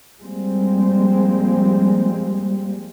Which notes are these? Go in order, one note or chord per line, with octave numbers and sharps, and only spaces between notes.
F3 G3 G#3 A#3 C4